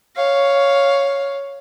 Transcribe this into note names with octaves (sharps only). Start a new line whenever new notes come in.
C#5 F5